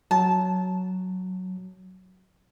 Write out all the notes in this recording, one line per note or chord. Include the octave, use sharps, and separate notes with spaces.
F#3 A5